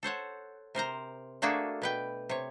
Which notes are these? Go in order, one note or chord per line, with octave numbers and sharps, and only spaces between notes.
A4 C5 C#5 F#5
C3 A#4 C5 A#5
A3 A#3 D4 F#4 G#4 A4
B2 B4 G5
C3 C#5